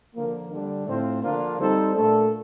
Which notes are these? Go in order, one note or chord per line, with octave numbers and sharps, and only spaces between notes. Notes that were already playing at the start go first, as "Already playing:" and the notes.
D3 F3 A#3
D3 G3 D4
A2 A3 C4 F4 C5
D3 F3 A#3 D4 F4
G3 C4 D#4 A4 C5
A#2 A3 D4 A4